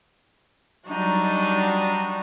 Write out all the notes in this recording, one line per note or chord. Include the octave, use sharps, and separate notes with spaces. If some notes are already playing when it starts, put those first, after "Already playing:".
F#3 G3 D4 D#4 F#4